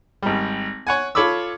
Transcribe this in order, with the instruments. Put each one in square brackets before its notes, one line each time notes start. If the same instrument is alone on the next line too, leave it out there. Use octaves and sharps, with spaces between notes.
[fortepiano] G#1 G3
C#5 F#5 G#5
F4 A4 C#5 B5 D6 E6